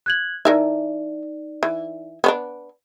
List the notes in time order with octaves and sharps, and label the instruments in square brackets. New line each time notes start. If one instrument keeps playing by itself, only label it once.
[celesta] F#6 G#6 F#7
[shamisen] E3 A#4 E5 [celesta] D#4 D5
[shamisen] E3
B3 C#4 D4